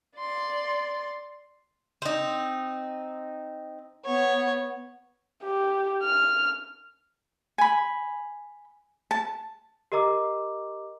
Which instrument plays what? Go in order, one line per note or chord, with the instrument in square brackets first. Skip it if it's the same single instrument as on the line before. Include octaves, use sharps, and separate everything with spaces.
[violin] D5 C6
[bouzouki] C4 D#4
[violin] B3 C#5
[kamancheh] G4
F6
[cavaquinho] G#5 B5
A5
[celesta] G4 A#4 D#5 A#5 D6 E6